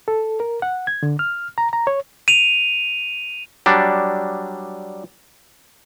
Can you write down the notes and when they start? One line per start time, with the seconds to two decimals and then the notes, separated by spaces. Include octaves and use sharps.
0.08 A4
0.40 A#4
0.62 F#5
0.87 G#6
1.03 D3
1.19 F6
1.58 A#5
1.73 A#5
1.87 C#5
2.28 D#7 F7
3.66 F#3 G3 D4